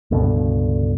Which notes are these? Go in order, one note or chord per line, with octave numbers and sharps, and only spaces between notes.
C#2 G2 B2 D3